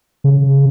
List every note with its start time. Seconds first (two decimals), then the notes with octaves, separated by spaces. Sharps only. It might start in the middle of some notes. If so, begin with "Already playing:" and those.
0.24 C#3